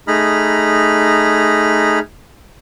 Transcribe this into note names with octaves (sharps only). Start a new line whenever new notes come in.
A3 D#4 G#4 A#5 B5 F6